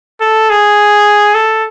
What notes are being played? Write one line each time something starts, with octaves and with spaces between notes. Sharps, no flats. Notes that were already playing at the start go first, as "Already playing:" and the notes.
A4
G#4
A4